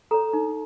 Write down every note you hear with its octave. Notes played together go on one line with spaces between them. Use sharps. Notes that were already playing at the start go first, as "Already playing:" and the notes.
A4 C#5 A#5
D#4